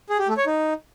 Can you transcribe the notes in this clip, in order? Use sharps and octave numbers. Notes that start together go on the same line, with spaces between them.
G#4
G4
A3
C#5
D#4